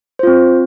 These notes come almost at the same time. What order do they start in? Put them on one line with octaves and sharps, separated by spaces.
C5 F4 C4